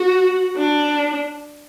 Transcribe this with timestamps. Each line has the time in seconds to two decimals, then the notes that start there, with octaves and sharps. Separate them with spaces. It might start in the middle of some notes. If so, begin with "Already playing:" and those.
Already playing: F#4
0.56 D4